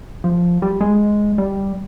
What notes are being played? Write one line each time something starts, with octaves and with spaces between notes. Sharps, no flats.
F3
G3
G#3
G3